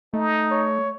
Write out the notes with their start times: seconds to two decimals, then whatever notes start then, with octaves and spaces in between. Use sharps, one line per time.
0.14 A3 D#4
0.51 C#5